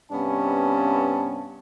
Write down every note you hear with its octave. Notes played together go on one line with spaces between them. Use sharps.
G2 C3 B3 C#4 A5